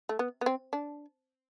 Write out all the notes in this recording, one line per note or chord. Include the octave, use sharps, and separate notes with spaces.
A3
B3
B3
C4
D4